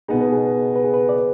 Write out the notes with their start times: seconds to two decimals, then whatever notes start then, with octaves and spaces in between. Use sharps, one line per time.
0.08 B2 B3 D#4 G#4
0.21 B4
0.32 G#4
0.76 B4
0.84 G#4
0.94 B4
1.09 D5